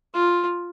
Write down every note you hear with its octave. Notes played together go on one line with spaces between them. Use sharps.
F4